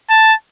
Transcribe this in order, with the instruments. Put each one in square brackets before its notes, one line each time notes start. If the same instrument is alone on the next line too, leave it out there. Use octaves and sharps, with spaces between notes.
[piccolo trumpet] A5